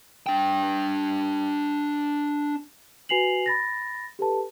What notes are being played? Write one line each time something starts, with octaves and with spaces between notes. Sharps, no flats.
D4 G5
F#4 B4 G#5 C7 F7 F#7
B5 A6 A#6
G4 A4 B4 A5